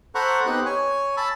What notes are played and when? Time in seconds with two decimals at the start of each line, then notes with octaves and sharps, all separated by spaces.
0.15 A4 C5 F#5 A#5 B5 C#6
0.46 B3 C4 D#4 G4 F#6
0.66 C#5 G#5
1.17 A5 B5 E6